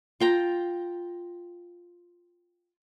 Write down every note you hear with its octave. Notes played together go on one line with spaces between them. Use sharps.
F4 G5 A#5